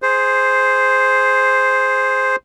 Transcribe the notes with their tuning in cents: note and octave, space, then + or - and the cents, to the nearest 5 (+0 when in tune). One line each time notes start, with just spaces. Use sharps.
G#4 +5 C5 +0